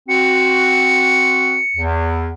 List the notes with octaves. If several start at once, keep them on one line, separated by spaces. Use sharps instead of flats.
C4 F#4 C#7
E2